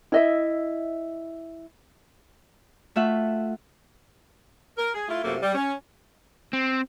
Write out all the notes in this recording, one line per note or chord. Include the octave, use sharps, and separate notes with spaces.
E4 D#5 E5
A3 F4 E5 F#5
A#4
G#4
A3 E4 F4
F#2 C3 A3 A#3 F4
G3
C#4
C4